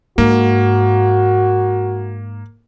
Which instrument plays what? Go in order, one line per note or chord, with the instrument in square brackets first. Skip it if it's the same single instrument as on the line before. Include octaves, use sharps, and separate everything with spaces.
[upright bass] G#2 [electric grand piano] A#3 [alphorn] F#4